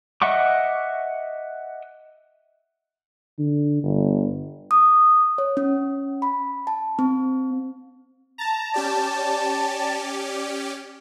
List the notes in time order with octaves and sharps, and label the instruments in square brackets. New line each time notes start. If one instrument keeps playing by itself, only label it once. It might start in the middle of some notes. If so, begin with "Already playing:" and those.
[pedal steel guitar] D#5 E5 F#5 C#6 D6
[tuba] D3
G1
[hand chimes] D#6
C#5
C#4
B5
A5
C4
[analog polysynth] A5 [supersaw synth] A#5
[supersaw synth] C#4 G4 D5